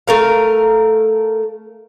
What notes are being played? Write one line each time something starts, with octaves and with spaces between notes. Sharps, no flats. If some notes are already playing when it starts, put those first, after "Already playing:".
A3 A#4 F5